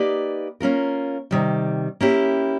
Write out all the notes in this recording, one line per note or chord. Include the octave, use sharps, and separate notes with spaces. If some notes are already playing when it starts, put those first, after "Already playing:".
Already playing: A#3 D#4 G4 B4 D5
A#3 C#4 F4 A#4
C3 D#3 G3
A#3 C#4 E4 G4